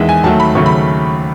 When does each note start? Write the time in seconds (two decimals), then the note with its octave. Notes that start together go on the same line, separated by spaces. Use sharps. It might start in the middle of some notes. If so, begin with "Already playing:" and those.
Already playing: E2 D#3 G#3 E5
0.09 G#5
0.24 D#2 D#3 F#3 A3 A5
0.40 B5
0.55 D#2 C#3 F#3 A3 C#6
0.66 B5